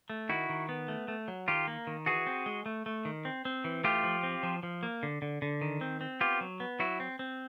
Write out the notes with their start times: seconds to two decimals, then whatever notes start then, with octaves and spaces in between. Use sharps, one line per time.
0.10 A3
0.29 D#3 E4 F#4
0.49 D#3
0.69 B3
0.88 A3
1.08 A3
1.28 F#3
1.48 D#3 F4 G4
1.67 A#3
1.87 D#3
2.06 E3 F#4 G#4
2.27 C4
2.46 G#3
2.66 A3
2.86 A3
3.05 D#3
3.25 C4
3.45 C4
3.64 E3
3.84 A3 F4 G4
4.04 F3
4.23 C4
4.43 F3
4.63 F3
4.83 A#3
5.03 D3
5.22 D3
5.42 D3
5.61 D#3
5.81 C4
6.01 C4
6.20 B3 F4 G4
6.41 F#3
6.60 B3
6.79 F#3 E4 F#4
7.00 C4
7.19 C4